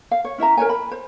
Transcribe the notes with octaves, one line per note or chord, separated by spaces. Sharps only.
F5
C#5
C#4 E4 E5 A#5
A#4 C5 C#5 G#5
B5
C5